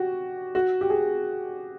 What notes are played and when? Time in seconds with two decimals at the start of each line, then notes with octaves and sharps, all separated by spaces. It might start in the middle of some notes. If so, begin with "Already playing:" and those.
Already playing: F#4 G4
0.55 F#4
0.81 G4
0.90 G#4